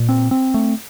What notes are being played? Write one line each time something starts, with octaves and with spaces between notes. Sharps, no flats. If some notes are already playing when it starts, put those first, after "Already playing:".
Already playing: A#2
C4
C4
A3